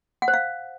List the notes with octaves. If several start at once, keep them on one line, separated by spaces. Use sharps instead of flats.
F#5
C5
F5